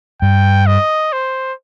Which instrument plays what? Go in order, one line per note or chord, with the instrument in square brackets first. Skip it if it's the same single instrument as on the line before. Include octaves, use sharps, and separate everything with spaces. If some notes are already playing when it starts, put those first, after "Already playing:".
[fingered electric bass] G2 [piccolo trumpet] G5
[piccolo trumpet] D#5
C5